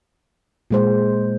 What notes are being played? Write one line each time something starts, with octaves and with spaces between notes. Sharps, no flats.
A#2 G#3 C5